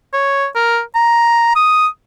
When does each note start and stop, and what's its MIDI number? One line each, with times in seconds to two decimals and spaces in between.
0.13 0.47 73
0.56 0.80 70
0.95 1.55 82
1.56 1.87 87